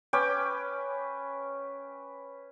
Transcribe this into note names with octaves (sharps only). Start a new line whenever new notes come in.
C#4 B4 G5 D6